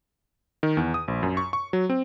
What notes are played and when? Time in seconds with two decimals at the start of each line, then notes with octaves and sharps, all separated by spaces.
0.63 D#3
0.77 E2
0.94 D#6
1.08 A#1
1.23 F#2
1.37 C#6
1.53 C#6
1.73 F#3
1.89 C4